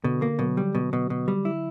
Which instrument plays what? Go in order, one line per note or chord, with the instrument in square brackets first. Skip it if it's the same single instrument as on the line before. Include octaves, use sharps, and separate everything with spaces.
[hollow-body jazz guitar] B2 [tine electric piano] D3
[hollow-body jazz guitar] A#3
[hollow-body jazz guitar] B2 [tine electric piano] F#3
[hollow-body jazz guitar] G3
B2
B2
B2
G3
E4